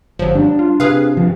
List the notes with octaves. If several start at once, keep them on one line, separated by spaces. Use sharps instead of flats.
G1 F3 F#3
G3 D4
F4
C3 G#4 B4 F5
G2 F3